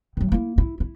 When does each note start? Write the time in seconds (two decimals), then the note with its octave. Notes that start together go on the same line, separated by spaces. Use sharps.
0.17 D#3 F#3
0.32 A#3 E4
0.58 E4
0.80 E4